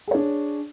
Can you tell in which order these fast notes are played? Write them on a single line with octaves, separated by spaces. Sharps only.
G#4 C#5 D4